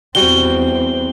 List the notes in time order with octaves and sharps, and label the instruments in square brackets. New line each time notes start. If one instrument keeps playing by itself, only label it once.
[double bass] E2 C4 [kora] G3 F#4 G5 [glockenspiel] G7